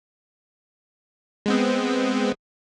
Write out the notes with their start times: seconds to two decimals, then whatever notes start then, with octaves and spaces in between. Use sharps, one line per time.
1.46 G#3 B3 C4